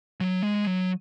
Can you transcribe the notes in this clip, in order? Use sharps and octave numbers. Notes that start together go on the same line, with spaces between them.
F#3
G#3
F#3